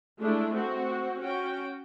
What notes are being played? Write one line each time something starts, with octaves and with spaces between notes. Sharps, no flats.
G#3 A3 D4 E4
C4 F#4
C#4 F#4 G5